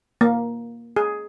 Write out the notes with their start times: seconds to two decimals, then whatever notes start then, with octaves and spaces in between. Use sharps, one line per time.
0.21 A#3
0.96 G#4